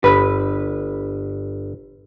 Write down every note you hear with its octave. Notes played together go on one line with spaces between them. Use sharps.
G1 B4